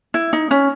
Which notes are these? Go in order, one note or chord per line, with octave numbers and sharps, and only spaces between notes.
E4
D#4
C#4